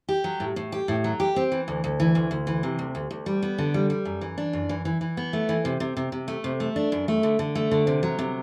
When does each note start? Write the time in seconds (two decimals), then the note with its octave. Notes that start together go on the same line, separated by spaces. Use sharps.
0.09 G4
0.24 F#3
0.40 A2
0.56 A2
0.72 G4
0.88 A2
1.04 F#3
1.20 G4
1.36 C4
1.52 E3
1.68 D2
1.84 D2
2.00 E3
2.15 D2
2.31 D2
2.47 E3
2.63 C3
2.79 D2
2.95 D2
3.11 D2
3.26 G3
3.43 B3
3.58 D3
3.74 G3
3.90 G3
4.05 F#2
4.21 E3
4.38 D4
4.53 F#2
4.69 E3
4.85 E3
5.01 E3
5.17 B3
5.33 A3
5.49 E3
5.65 C3
5.80 C3
5.97 C3
6.12 C3
6.28 A3
6.44 C3
6.60 A3
6.76 D4
6.92 F#2
7.08 A3
7.23 D3
7.39 D3
7.55 A3
7.71 D3
7.87 C3
8.03 F#3
8.19 C3